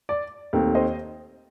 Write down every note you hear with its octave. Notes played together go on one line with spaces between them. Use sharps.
D5
D#2 D#3 A3 C4
C5 D#5